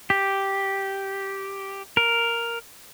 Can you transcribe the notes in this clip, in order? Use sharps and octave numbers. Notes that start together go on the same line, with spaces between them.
G4
A#4